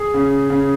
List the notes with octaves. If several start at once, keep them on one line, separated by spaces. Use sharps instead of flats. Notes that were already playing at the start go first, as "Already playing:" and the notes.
Already playing: G#4
C#3
C#3